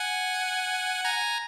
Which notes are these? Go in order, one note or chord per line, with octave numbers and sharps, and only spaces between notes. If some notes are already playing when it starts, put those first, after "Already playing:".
Already playing: F#5 G#5
G#5 A#5